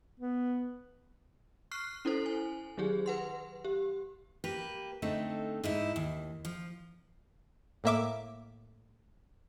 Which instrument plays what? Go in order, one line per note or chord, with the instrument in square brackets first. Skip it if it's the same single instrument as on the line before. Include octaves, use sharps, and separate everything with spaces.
[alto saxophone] B3
[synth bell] C#6 F6 F#6 C7
C#4 E4 A4 C5
G#5
D#3 F#3 G4 G#4
B4 F#5 C6
G4
[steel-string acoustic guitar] A#3 G4 B4
D3 A3 C4 D#4
G#2 D#4 E4
D#2
F3
[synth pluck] A2 A#3 E5 D6